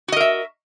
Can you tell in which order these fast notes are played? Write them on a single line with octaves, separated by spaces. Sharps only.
F#4 D#5 A#4 E5